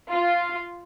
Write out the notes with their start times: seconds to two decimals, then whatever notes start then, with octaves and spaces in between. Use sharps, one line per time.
0.13 F4